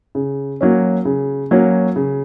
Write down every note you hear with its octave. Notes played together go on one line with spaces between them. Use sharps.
C#3
F#3 A#3 C#4
C#3
F#3 A#3 C#4
C#3